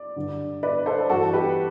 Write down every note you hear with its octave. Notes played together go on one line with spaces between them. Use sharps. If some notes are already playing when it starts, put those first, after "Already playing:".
Already playing: D5
G2 D3
B4 D5
A4 C5
G2 E3 F#4 A4
G4 B4